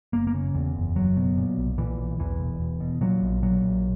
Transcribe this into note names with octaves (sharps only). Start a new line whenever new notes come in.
F#1 A#3
A#3
C#3
E2
F#1
F#1 F#3
B2
A#2
B1
A#2 E3
B1
E2 E3
E1
E1
B2
A#2 F#3
A#1
A#2 F#3
A#1